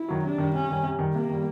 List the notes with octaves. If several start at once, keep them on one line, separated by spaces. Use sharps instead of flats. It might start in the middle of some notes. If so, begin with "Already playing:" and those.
Already playing: E4
D#3 F#3
C3 D4
D#3 G3
C3 C#4
D#3 G3
C3
D#3 G3
C3 A#3
D#3 G3